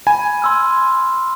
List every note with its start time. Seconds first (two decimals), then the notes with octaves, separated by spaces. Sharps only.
0.07 G#5 B5
0.42 C6 E6 F6